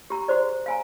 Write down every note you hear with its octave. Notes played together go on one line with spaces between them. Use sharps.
G4 A#5
F#4 G#4 C5 D5
F5 G#5 A#5